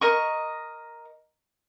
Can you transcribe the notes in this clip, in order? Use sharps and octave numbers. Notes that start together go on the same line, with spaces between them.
A#4 D#5 C#6